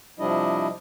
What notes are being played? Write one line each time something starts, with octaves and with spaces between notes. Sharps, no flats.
C3 F3 G3 D4 E4 D#5